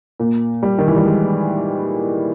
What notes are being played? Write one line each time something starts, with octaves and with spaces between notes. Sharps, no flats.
A#2
G3
D#3
E3
G3
G#3